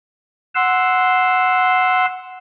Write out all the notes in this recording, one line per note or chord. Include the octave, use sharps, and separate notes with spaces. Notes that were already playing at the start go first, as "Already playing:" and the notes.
F#5 C6 E6